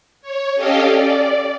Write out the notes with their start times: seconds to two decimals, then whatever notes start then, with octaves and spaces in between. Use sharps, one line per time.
0.22 C#5
0.55 C#4 G4 A4 D#5 F5 G5
0.85 D5